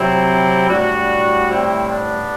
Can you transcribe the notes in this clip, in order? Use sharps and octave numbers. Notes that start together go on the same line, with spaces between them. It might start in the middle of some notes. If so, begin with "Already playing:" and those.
Already playing: C3 F#3 C4 E4
A2 G3 D4 F#4
C4 E4
B3 D4